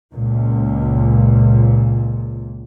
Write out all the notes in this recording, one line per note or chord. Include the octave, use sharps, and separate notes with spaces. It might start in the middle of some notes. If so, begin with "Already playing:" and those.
C#2 A#2